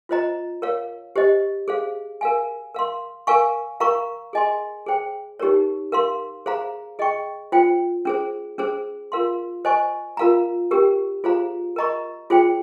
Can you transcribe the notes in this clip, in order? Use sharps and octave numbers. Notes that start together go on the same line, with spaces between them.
F4 C5 D#5 A#5
A#4 C#5 F5
G4 C5 D#5
G#4 C5 F5
A#4 F5 G#5
A#4 F5 C6
A#4 F5 G#5 C#6
A#4 F5 A#5 C#6
G#4 D#5 G#5 C6
G#4 C5 G5
D#4 G4 A#4 C#5
A#4 F5 C6
G#4 C5 F5 A#5
G#4 D#5 G5 C#6
F4 C5 G5
C#4 G#4 C5
C#4 G#4 C5
F4 A#4 F5 C6
C5 D#5 G#5 C#6
F4 A#4 F5 A#5
C#4 G4 A#4
F4 G#4 C5 F5 A#5
A#4 D#5 A#5 C#6
F4 G#4 C5 G5